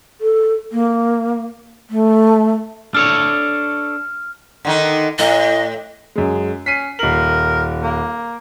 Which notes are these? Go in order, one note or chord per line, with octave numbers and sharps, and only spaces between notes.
A4
A#3
A3
D4 A4 C#5 F6
D3 D#3 D#4
A2 D#5
F#2 G#3
C#4 B6 C7 D#7
D#1 A#4 F#7
A#3